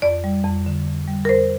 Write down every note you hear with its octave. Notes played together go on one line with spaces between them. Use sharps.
F2 D5
G3
F2
D3
F2
G3
A#4
F2 C5